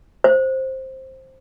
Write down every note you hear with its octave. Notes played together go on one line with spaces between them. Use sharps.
C5